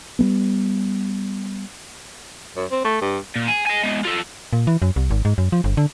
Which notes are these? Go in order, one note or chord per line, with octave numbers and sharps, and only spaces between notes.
G3 A3 B3
F#2
C4
A3
G2
A#2
G#4
D#5 G#5
G#3 B3
F4 A4
A#2
E3
F#2
C2
G#1
G#2
F#2
F3
G1
D3